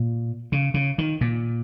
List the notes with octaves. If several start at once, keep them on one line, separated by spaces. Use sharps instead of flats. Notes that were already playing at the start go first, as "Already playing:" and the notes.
Already playing: A#2
C#3
C#3
D#3
A#2